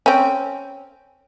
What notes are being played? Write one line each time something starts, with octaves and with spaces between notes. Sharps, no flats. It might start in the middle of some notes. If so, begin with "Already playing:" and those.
C4 C#4